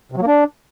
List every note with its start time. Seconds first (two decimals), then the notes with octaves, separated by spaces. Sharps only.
0.12 C3
0.17 F#3
0.22 A#3
0.27 D4